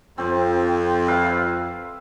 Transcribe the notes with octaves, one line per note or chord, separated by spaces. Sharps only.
F2 C4
B4 E5 F5